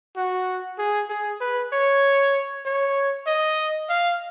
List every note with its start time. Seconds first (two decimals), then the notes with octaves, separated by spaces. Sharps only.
0.17 F#4
0.78 G#4
1.10 G#4
1.41 B4
1.73 C#5
2.66 C#5
3.27 D#5
3.89 F5